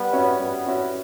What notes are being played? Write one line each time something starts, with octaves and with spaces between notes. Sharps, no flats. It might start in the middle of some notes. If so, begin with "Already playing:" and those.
Already playing: G3 B3
C#4 F#4 C#5 E5
G3 B3
C#4 F#4 C#5 E5